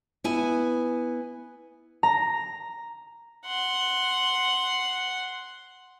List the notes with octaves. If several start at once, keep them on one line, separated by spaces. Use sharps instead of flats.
B3 E4 G#5
A#5
F#5 C6